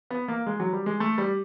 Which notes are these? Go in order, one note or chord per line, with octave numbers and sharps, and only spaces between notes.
B3
A#3
G#3
F#3
G3
G#3
A3
G3